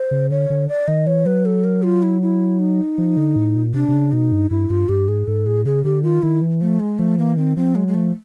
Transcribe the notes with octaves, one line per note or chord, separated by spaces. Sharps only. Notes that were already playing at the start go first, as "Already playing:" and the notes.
Already playing: C5
C#3
D3 C#5
D3
D5
D#3 D#5
E3 C#5
F#3 B4
A4
A#4
F4
E4
E4
D#4
F3
D3
A2
A#2
C3 D4
C3
C#3
B2 D#4
G2
G2 E4
G2 F4
G2 G4
G#2 G#4
G#2 A4
A2 G#4
C#3 G#4
D3 G4
D#3 F4
D#3 E4
E3
F3 A3
G#3
F3 A3
E3 A#3
D#3 C4
F3 C4
F#3 G#3
G#3
F3 A3